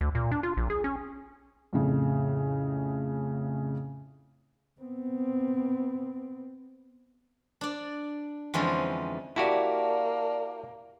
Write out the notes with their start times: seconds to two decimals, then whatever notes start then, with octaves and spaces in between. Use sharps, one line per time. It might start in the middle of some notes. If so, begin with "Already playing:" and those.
0.01 D2
0.15 A#2
0.31 D4
0.43 F4
0.57 A#1
0.70 G#4
0.84 C#4
1.73 F2 A2 C#3
4.81 B3 C4
7.61 D4 D5
8.54 F2 D3 E3 G#3 C4 C#4
9.36 A#3 E4 F#4 G4 D5 A5